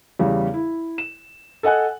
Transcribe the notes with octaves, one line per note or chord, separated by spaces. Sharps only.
E2 C#3 G3
E4
E7
A4 D#5 F#5 G#5 F#6